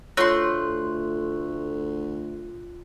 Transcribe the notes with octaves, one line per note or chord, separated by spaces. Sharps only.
D2 A3 F4 C#5 C6 F#6